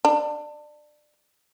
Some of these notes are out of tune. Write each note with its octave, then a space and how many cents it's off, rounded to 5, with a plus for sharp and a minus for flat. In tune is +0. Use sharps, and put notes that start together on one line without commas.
D4 +25